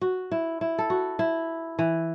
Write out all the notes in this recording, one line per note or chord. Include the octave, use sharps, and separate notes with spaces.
F#4
E4
E4
A4
F#4
E4
E3